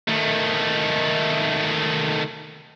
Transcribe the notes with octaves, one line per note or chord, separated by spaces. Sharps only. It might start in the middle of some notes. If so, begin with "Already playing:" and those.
D#3 A3